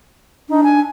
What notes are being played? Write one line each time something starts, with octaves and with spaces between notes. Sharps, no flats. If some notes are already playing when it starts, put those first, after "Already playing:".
D4 D#4
G#5